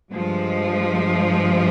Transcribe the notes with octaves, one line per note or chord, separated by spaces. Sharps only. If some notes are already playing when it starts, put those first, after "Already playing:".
G2 F3 G#3